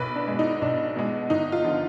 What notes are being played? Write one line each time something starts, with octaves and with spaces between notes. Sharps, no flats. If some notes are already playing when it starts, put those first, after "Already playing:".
Already playing: B1 B4
D4
B2 G#3
D#4
B1 D4
B2 G#3
G1 D#4
F4
D3 F3